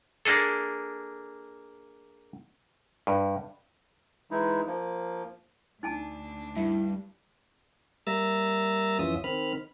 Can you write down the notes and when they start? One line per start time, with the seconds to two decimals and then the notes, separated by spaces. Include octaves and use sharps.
0.25 A#3 D4 G#4 A4
3.07 G2
4.31 E3 G#3 D#4 E4
4.67 F3 A#3
5.83 D2 D4 D#4 G#5 A5
6.56 G2 E4
8.07 G3 A#3 E5 A#5 E6 A6
8.99 F2 E3 C#4 F4 E5 D#6
9.24 D#3 C4 B5 F6